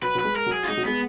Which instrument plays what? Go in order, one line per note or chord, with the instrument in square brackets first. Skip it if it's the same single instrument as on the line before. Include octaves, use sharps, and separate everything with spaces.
[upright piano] F#3 [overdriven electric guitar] B4
[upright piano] F#3
[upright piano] G#3 [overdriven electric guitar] B4
[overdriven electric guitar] A#4
[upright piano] F#3
[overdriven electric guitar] G#4
F4
[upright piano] G#3 [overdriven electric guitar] D#4
[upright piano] F#3
[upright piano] G#3 [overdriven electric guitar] B3